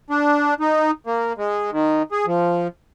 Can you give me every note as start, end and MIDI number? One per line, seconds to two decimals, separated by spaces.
0.10 0.54 62
0.60 0.91 63
1.07 1.33 58
1.38 1.71 56
1.72 2.03 51
2.12 2.26 68
2.27 2.67 53